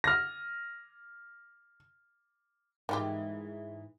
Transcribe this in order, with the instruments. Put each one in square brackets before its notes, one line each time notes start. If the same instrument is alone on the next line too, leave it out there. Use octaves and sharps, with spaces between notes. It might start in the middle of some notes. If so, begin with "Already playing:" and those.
[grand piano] F6 A#6
[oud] G#2 E3 [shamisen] D#3 F4 G4